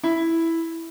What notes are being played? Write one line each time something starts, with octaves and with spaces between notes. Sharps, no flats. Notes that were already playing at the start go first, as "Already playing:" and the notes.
E4